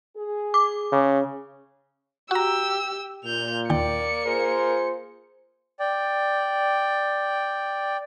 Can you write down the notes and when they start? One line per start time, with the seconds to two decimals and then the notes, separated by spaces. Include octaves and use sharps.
0.17 G#4
0.54 D6
0.92 C#3
2.31 F#4 G4 A#5 E6
3.24 A#2 G6 F7
3.70 D#2 A#3 D5 G5 C#7
4.25 F4 G#4 A#4 C5
5.80 D5 G5